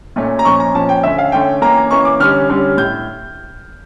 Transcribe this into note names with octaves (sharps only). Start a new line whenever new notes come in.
A#2 A3 C#4
A#5
A#2 F3 C#4 C#6
A#5
A#2 F3 C#4 A5
G5
D3 A3 C#4 E5
F5
D3 A3 C#4 G5
E3 A#3 C#4 A#5
E3 A#3 C#4 C#6
D6
D3 G3 C#4 F6
D3 G3 C#4
A2 G6